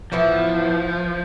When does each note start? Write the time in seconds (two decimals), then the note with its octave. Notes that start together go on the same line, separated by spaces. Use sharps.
0.12 A2 E3 F3 B3 E4